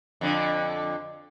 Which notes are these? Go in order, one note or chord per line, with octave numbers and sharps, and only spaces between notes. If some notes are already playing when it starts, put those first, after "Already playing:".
F2 D3